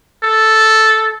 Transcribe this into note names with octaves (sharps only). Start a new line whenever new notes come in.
A4